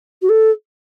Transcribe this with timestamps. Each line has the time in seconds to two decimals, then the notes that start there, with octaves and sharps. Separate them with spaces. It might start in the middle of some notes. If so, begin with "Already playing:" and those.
0.22 F#4
0.29 A4